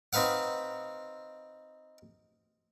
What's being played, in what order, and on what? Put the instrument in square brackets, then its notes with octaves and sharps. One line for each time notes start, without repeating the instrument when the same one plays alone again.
[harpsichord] C4 D#4 B4 F5 F#5